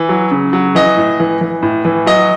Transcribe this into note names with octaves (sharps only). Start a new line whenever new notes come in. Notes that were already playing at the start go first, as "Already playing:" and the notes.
Already playing: E3
F#3
C#3
F#3
E3 D#5
A2
E3
E3
A2
E3
F#3 D#5